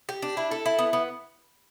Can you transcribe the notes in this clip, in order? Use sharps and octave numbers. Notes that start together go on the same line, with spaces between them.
G4
D4
E4
A4
E4
B3
B3